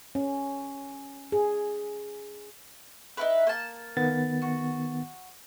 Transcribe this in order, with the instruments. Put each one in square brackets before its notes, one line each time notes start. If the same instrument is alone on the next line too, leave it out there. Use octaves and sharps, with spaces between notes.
[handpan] C#4
G#4
[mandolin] D#4 E4 B4
A#3 A5
[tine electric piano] D#3 B3 A6
[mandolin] F#4